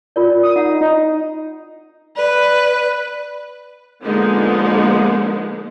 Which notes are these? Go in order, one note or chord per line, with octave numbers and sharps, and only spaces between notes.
F4 A#4 D5
D#6
D#4 F#5
D#4
B4 D5
D3 F3 G#3 A#3 B3 D#4